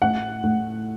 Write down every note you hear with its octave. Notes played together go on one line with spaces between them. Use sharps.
A2 F#5
A2